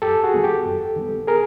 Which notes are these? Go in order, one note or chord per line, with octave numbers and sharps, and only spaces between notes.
F#2 G4 A4
F#4 G#4
D#3 G3 B3
G4 A4
F#2
D#3 G3 B3
G#4 A#4